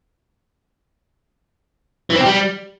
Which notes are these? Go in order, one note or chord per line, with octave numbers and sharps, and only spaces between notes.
E3
C4
G4
G3